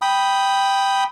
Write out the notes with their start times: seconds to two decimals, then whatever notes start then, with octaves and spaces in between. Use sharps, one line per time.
0.02 G5 B5 D#6